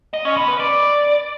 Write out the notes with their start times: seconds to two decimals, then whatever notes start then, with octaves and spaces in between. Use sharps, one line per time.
0.13 D#5
0.25 C#4
0.37 B3
0.48 B4
0.60 D5